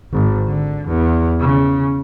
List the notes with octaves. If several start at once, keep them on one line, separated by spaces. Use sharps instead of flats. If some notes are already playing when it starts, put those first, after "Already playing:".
G#1
D3
E2
C#3